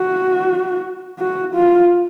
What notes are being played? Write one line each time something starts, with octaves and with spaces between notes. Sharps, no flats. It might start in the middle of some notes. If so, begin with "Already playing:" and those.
Already playing: F#4
F#4
F4